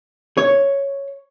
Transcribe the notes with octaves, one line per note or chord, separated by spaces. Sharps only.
C#5